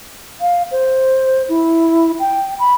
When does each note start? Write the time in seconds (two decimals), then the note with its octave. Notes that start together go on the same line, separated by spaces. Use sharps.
0.41 F5
0.72 C5
1.49 E4
2.20 G5
2.59 B5